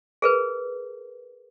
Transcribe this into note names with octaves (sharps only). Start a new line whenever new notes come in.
G#4 A#4 B4